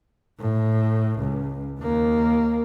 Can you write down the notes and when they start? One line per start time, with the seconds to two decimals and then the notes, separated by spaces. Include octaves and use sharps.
0.40 A2
1.20 C#2
1.80 D#2 A#3